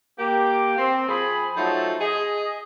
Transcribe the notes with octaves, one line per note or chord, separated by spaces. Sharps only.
A#3 G4
C4
F3 G#4 B5
F3 F#3 A3 D#4 A4
G#4 D#5